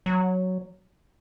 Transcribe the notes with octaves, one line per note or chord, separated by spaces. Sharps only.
F#3